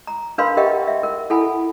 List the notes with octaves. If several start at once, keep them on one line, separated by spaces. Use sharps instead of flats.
A#5
D4 A#4 B4 F5 B5 C6
G4 A#4 D#5 E5 F#5 G5
E5
A#4
E4 A4 F#5 G#5 B5